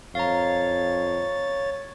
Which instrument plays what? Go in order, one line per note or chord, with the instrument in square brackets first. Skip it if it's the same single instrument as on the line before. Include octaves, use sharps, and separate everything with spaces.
[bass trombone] F2 [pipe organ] C#5 A6 [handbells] F5 A#5